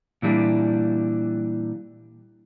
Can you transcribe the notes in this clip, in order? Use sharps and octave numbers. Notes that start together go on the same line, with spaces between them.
A#2 E3 G3 D4